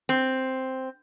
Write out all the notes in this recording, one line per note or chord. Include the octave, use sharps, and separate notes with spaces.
C4